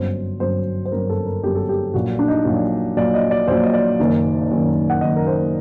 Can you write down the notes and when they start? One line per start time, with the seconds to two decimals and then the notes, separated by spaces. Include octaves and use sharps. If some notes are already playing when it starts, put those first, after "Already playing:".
Already playing: G1 F#2 F#3 C5
0.40 G1 F#2 F#3 C5
0.85 C5
0.92 G1 F#2 F#3 A#4
1.09 A4
1.26 A#4
1.43 G1 F#2 F#3 G4
1.55 A4
1.69 G4
1.94 A#1 A#2 F#3 F#4
2.19 D4
2.28 D#4
2.45 A#1 A#2 F#3
2.97 A#1 A#2 F#3 D5
3.14 D#5
3.31 D5
3.48 A#1 A#2 F#3 C5
3.64 D#5
3.74 D5
3.99 F#1 F#2 D#3
4.51 F#1 F#2 D#3
4.90 F#5
5.01 F#1 F#2 D#3 D#5
5.16 A#4
5.26 C5